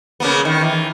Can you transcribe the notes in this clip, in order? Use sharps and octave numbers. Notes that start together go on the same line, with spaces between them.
C#3 A#3 B3
D#3
E3